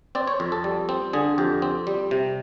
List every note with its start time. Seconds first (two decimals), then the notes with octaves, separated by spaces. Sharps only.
0.15 C4 D5
0.27 C#5
0.40 F2
0.52 A4
0.64 G3
0.89 C4
1.13 D3 G#4
1.38 F2 G4
1.62 C4
1.87 G3
2.11 C3